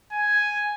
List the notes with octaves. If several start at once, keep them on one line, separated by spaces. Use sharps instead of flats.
G#5